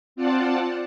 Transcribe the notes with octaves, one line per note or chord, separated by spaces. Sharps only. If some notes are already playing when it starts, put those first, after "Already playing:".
C4 F4 D5 F#5 A5